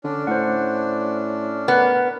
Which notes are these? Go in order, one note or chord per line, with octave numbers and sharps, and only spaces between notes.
D3 C#4 D4
A2 C5 F#5
B3 A#4 F#6